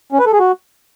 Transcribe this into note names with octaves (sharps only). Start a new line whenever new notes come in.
C#4
B4
A4
G#4
F#4